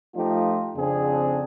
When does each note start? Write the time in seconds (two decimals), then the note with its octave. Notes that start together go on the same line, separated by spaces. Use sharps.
0.16 F3 A3 D#4 F4 G4
0.75 F2 C#3 C4 D4 G#4